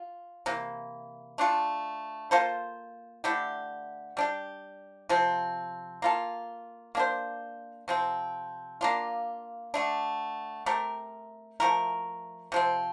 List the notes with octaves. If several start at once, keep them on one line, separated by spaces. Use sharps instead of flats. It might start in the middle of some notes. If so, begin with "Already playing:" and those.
Already playing: F4
C3 E3 A#3
A3 D4 F4 A4
A#3 F4 A4 C5
D3 A3 E4 G4
G3 D4 G4
C3 F3 C4
A#3 F4 A4
A#3 D4 G4 C5
C3 F3 C4
A#3 D4 F4
D3 A3 D4
A3 C4 G4 A#4
F3 A3 E4 A#4
C3 F3 C4